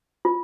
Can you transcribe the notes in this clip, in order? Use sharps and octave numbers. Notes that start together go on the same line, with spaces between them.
F4